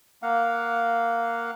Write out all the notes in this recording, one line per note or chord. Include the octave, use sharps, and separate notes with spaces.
A#3 F5 F#5